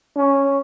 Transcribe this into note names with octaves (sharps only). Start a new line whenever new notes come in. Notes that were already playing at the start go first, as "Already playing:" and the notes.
C#4